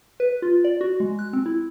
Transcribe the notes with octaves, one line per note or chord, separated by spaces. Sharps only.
B4
F4
D5
F#4
G#3
F#6
C4
E4